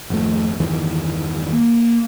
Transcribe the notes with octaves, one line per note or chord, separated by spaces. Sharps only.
G#1 F2 A3
G1 E2 D#3 E3
A#3